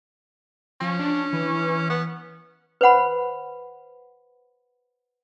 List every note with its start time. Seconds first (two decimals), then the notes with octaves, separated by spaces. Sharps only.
0.81 F3 C#4
0.99 D4
1.33 E3
1.90 B3
2.81 B4 C5 F#5 B5